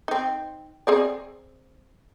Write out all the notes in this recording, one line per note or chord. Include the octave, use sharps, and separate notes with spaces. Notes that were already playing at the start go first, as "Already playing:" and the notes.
C4 D#4
C4 G#4 D5